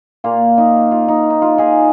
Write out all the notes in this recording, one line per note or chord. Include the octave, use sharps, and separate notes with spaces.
A#2 A#3 F4
D#4
F4
D#4
D#4
F4
D#4 G#4